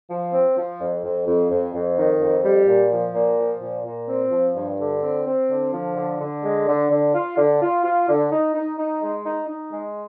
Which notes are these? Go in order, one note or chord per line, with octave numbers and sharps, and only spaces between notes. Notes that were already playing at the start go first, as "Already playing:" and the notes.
F3
C4
F3
F2
F2
F2
F2
F2
D#3
F2
G3
A#2
F3
A#2
F3
A#2
A#2
C4
F3
G2
D3
C4
C4
D3
F3
D3
D3
G#3
D3
D3
F4
D3
F4
F4
D3
D#4
D#4
D#4
G#3
D#4
D#4
G#3